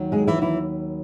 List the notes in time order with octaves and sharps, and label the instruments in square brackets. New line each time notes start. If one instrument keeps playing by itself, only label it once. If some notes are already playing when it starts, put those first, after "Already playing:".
Already playing: [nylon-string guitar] D#2 D#3 F#3
G#3 G#4
E3 E4
E3 E4